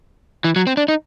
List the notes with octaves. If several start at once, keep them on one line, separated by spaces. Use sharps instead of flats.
E3
F#3
C4
D4
D#4